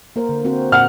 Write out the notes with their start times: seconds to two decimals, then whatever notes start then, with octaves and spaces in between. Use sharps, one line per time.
0.16 A#3 A#4 C5
0.29 D3
0.45 C4 F#4 C5
0.72 A#2 F#5 F6